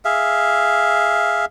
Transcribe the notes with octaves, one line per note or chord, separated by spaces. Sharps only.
G#4 E5 F5